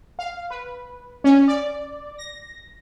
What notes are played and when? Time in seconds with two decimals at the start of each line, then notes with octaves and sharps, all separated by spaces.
0.19 F5
0.50 B4
1.24 C#4
1.48 D5
2.18 A#6